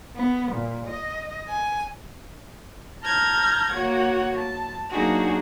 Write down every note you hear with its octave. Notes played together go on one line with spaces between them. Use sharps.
B3
A#2
D#5
G#5
A5 A#5 F6 G6 G#6 A#6
A#3 F#4 C#5 F#5
A5
F#3 A#3 D4 D#4 F#4 G#4